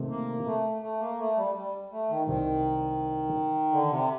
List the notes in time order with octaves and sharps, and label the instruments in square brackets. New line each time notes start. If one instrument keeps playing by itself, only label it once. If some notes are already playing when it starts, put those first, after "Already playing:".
Already playing: [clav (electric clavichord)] C3 D#3 A3
[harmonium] A#3
A3
A3
A#3
A3
G3
G3
A3
D#3
[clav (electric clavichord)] C2 C3 G3 C4 [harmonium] D#3
[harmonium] D3
C3